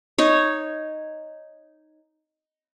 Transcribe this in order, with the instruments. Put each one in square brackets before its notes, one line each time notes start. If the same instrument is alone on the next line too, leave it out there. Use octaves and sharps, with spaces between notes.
[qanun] D#4 C#5